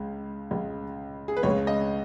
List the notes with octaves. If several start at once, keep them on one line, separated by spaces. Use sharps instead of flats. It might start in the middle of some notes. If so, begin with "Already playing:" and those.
Already playing: C#2 C#3 G#3
C#2 C#3 G#3
G#4
B4
C#2 C#3 G#3 C#5
D#5